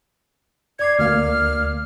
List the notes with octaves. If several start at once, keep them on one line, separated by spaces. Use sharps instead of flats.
D5 D6 G#6 C7
D2 A#3 F6